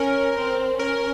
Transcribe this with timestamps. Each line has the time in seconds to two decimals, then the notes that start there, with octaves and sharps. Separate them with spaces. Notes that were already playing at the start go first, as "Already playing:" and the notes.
Already playing: C#4 A#4
0.36 C4
0.79 C#4 A#4